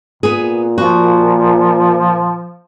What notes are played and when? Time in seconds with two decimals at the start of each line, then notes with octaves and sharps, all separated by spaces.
0.23 A#2 B3 G#4
0.78 F3 F#4